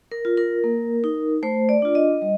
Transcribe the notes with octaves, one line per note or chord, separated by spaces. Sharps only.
A#4
F4
A#4
A#3
D#4
A3 C5
D5
D4 F4
D#5
G3